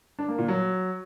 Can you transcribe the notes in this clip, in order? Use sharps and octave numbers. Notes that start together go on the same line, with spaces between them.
D4
A#3
A#2
F#3